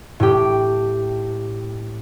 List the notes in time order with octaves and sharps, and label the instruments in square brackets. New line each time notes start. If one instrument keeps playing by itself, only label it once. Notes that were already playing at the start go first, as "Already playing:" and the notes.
[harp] A2 G4